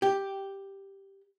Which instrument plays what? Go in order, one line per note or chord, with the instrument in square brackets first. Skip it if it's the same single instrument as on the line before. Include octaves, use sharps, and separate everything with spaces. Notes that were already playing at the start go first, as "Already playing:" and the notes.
[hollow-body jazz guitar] G4